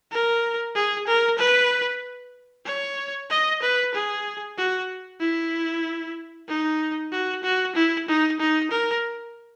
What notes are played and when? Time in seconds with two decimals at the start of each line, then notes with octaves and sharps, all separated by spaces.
0.12 A#4
0.75 G#4
1.07 A#4
1.38 B4
2.66 C#5
3.30 D#5
3.62 B4
3.94 G#4
4.58 F#4
5.20 E4
6.48 D#4
7.12 F#4
7.43 F#4
7.75 E4
8.08 D#4
8.40 D#4
8.71 A#4